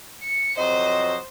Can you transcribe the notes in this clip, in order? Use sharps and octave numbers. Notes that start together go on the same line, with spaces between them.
C#7
F2 F#3 C5 D#5